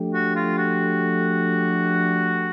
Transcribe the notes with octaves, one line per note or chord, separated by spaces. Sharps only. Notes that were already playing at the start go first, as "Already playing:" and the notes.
Already playing: F3 A3 D4 G4
F#4
F4
F#4